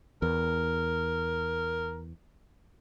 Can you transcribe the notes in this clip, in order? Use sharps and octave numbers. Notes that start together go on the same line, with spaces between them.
E2 A#4